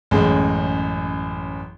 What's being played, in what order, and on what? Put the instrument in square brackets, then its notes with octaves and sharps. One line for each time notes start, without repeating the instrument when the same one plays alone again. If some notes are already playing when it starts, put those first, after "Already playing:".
[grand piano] A1 F#2 G#3